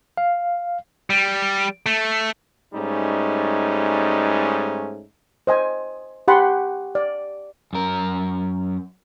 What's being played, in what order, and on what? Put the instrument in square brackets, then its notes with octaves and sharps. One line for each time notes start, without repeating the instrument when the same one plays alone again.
[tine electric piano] F5
[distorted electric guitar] G3
A3
[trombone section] G#2 G3 A3 C#4 D#4
[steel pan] C5 D#5 G#5
G4 F#5 B5 C6
D5
[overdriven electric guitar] F#2 A#4